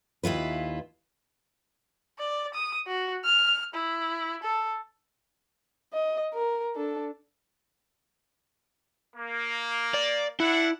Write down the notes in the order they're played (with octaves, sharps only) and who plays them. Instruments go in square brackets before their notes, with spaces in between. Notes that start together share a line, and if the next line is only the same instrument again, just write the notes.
[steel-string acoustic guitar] D#2 E4 F4 B4
[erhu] D5
D#6
F#4
F6
E4
A4
[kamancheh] D#5
A#4
D4 A4
[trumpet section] A#3
[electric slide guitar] D5
[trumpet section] D4 E5 F#5 [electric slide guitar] E4